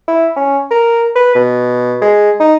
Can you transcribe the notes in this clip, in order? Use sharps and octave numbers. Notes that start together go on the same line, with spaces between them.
E4
C#4
A#4
B4
B2
G#3
D#4